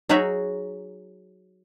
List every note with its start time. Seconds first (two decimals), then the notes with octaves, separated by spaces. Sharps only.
0.09 F#3 D#4 F#4 G#4 C#5 E5